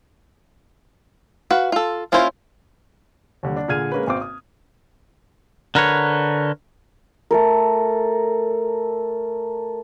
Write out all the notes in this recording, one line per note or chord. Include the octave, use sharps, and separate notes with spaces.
F#4 B4 F5
F4 A4
A#3 C#4 E4 F4 C5
D#2 D3 G3
D4
A#2 D3 G#4 F6 G#6 D#7
G#3 A#3 C#4 B4
G#1 C4 D6
D#6
D3 A#4 B4 C#5
A3 A4 A#4